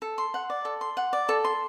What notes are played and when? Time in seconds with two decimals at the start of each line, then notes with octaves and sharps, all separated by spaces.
0.02 A4
0.18 C6
0.34 F#5
0.50 D5
0.65 A4
0.81 C6
0.97 F#5
1.13 D5
1.29 A4
1.45 C6